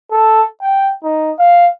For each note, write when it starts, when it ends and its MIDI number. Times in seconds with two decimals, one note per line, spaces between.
0.12 0.44 69
0.62 0.91 79
1.04 1.32 63
1.39 1.69 77